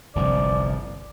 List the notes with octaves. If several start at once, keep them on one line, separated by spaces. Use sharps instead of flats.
G1 C2 F3 D5